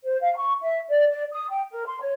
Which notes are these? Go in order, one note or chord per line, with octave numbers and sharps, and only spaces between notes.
C5
F5
C#6
E5
D5
D5
D#6
G5
A#4
C6
C#5